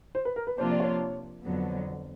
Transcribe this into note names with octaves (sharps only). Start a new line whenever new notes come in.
C5
B4
A#4
B4
C3 F3 A#3 D4 F4 C5
D5
C#5
F2 D3 F#3 B3